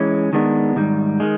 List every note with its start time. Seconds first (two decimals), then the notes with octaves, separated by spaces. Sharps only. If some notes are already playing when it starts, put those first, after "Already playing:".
Already playing: E3 G#3 C#4
0.33 D#3 G#3 B3 D4
0.76 G#2 D#3 G3
1.20 D#3 G#3